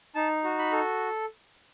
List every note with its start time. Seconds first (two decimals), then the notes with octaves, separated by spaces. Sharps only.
0.15 D#4 A5
0.44 F#4
0.59 B5
0.72 A4